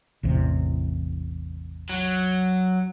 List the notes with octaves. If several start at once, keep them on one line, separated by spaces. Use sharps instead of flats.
A1 E2 C3
F#3